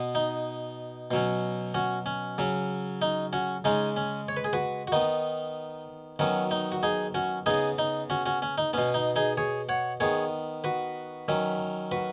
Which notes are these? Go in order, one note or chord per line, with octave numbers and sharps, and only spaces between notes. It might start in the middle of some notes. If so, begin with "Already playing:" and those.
Already playing: B2 B3
D#4
B2 F#3 C#4
C#4 F#4
C#4
C#3 F#3 C#4
D#4
C#4 F#4
C#3 G#3 C#4 D#4
C#4
C#5
B4
G#4
F#4 B4
F#4
D#3 B3 D#4
D#3 F#3 B3 C#4 F#4
D#4
F#4
D#4 G#4
C#4 F#4
C#3 B3 D#4 G#4
D#4
C#4 F#4
C#4 F#4
C#4
D#4
B2 B3 C#4
D#4
D#4 G#4
G#4 C#5
C#5 F#5
D#3 B3 G#4 C#5
F#4 B4
D#3 F#3 C#4
F#4 B4